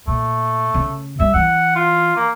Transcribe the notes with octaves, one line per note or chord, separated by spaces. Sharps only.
A#2 A3
C#3
G3 E5
E3 F#5
F4
A#3